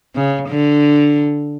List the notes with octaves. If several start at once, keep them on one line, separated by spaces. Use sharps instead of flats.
C#3
D3